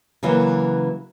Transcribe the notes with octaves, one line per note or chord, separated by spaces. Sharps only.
C#3 E3 F#3 A#3